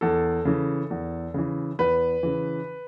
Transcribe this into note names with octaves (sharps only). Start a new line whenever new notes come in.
E2 A4
C#3 E3
E2
C#3 E3
E2 B4
C#3 E3